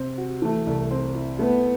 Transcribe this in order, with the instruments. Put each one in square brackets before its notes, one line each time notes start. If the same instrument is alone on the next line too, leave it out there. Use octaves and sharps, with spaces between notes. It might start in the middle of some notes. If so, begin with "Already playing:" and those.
Already playing: [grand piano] C3 C4
F#4
[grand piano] E3 [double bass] A3
[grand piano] C2
C4
E4
[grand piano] A3 [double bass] B3